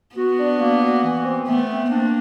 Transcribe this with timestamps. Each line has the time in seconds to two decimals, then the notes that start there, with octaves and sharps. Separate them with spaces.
0.16 B3 F#4
0.38 D4
0.59 A#3
0.81 F#4
1.04 E3
1.25 C4
1.46 A3 B3
1.68 C4
1.90 A#3 D4